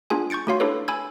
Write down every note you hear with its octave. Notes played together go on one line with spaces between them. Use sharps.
B3 D4 F4 G#4 G#5
C#6 G6 A6 C#7 D7
A3 C#4 F#4 C#5 F5 C6
D4 E4 G4 A4 B4 C#5
G#5 B5 E6 G#6